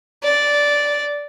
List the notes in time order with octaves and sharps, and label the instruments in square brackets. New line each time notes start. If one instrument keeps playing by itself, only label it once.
[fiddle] D5